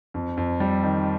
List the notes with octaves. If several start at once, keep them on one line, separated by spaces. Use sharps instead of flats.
F2
F2
G3
D#3